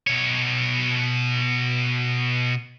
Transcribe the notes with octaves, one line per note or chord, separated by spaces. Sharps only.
B2 C#5